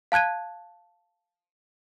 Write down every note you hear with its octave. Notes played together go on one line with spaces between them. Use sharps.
F5 A5 F#6 G#6 D#7